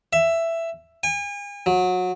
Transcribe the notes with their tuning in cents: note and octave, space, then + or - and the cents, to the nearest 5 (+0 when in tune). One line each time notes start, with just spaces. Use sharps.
E5 +10
G#5 -40
F#3 -25